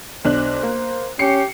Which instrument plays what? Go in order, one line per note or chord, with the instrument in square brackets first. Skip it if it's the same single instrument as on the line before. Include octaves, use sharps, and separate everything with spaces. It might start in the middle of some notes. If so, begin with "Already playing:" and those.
[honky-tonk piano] B1 D4 F#6 [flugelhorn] C5
[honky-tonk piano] A#3
[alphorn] C#4 [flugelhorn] G4 [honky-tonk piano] C7 C#7